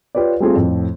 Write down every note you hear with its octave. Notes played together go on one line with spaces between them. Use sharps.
F4 G4 B4 C#5 D5
G3 A3 C4 F4 G#4
F2 A2